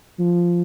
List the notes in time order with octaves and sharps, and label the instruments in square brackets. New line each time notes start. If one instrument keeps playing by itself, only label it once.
[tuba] F3